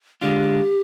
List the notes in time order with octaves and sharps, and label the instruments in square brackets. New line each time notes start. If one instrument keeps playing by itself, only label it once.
[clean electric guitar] D3 G#3 D4 F4 [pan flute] G4